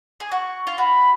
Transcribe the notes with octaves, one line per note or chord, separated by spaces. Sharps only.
G#4
F#4 C#6
F4
F#4 B5